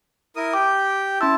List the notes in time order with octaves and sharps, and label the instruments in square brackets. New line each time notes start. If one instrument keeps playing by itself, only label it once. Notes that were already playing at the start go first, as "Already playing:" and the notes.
[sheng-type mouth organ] E4 A#4 D#6
[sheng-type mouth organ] G4 G5 [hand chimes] D6
[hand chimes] C#4 C6 E6 [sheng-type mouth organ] E4 A5